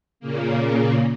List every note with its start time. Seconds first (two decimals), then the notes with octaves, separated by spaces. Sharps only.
0.20 A#2 C#3 A#3